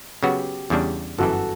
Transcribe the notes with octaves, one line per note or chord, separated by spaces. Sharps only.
C#3 F#3 B3 F#4 G4
E2 C#3 G3 D4
G1 F#2 E3 F#4 A4